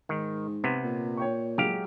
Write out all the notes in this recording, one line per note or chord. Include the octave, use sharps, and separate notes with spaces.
G#2 D#3
C3 B3 G#6
A#2
C#5 G5 C#6
F#3 G#3 G4 F5